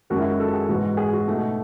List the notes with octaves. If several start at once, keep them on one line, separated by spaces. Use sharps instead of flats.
F#2 D#3 G#3 F#4
E4
F#4
A4
G#4
G#2 E3 B3 F#4
G#4
F#4
B2 A3 D#4